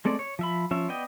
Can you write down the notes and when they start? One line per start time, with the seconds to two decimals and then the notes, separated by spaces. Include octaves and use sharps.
0.05 G#3 A3 C4 D5
0.19 C#5
0.39 F3 E5 B5
0.71 F3 C#4 E5
0.88 B3 D5 D#5 G5